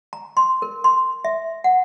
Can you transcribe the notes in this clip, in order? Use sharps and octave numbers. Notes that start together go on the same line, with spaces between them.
A#5
C6
A#4
C6
E5
F#5